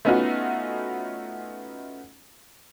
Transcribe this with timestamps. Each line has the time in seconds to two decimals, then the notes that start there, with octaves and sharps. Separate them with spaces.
0.05 A3 B3 C#4 D#4 F4 F#4